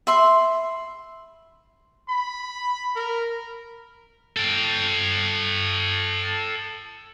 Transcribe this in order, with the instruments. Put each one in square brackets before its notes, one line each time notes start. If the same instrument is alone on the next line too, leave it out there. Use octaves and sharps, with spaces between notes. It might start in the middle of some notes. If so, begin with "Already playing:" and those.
[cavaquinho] E5 B5 C6
[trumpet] B5
A#4
[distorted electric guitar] A4 G5